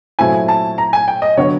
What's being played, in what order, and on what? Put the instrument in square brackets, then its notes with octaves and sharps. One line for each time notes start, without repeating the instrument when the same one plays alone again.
[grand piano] A#2 F#3 A3 C4 E4 [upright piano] G#5
[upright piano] A5
A#5
G#5
G5
D#5
[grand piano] D3 F#3 B3 D4 F#4 [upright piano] C#5